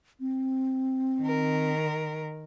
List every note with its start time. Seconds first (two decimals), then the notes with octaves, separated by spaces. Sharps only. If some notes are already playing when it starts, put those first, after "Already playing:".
0.20 C4
1.22 D#3 A#4